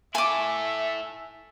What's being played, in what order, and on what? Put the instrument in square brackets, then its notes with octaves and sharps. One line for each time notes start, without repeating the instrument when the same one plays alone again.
[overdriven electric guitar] E4 A4 [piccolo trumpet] E5 [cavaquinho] G#5 D6